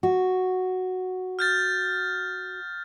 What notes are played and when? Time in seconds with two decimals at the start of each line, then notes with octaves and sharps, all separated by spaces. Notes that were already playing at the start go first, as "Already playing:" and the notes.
0.03 F#4
1.39 F6 G6 A6